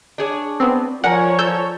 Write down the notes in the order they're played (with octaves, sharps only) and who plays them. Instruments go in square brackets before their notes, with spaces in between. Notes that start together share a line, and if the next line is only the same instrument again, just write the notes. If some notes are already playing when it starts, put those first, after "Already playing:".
[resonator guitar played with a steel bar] D4 G#4 C#5
[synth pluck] B3 C4
[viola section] F3 C#5 [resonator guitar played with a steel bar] A#4 [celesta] D5 G#5 A#5 [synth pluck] F#5
[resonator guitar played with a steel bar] A4 [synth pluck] E6 G6